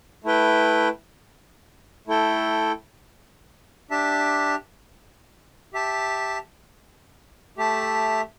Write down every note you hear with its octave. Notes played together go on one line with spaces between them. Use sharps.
A3 E4 B4 G5
A3 E4 A4 G5
D4 G4 E5 A5
G4 E5 A5
A3 G4 E5 A5